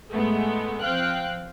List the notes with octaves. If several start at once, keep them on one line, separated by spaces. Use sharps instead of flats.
A2 G#3 A3 B3
F3 C4 F5 G5 F#6